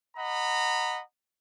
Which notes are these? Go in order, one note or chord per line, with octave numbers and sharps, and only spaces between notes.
D#5 F#5 A#5 B5